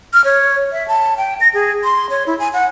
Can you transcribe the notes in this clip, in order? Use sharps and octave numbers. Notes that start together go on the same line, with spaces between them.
F6
C#5
E5
A5
G5
A#6
G#4
C6
C#5
E4
G#5
F#5